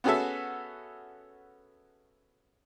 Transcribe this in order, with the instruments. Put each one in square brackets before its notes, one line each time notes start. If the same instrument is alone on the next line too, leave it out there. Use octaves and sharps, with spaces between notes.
[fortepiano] B3 C#4 F#4 G#4 A4 E5